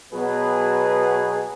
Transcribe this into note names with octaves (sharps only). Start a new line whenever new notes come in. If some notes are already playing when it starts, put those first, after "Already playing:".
B2 F#3 B3 G#4 B4